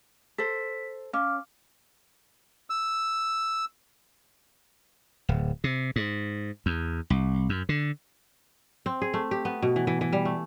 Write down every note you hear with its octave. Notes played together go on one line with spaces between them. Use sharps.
A4 C5 B6
C#4 F5 D6 F6
E6
D1
C3
G#2
E2
C2
F#2
D3
C4
G#4
A3
G4
B3
B2
E3
E3
E3
G3
A3